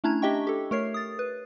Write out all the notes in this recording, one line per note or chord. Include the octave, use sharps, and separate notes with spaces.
A3 C#4 D4 E4 A#5 G#6
D4 G4 D#5 E5 G5 C#6
G4 A4
A3 A#4 C#5 C7
D#6 A6
B4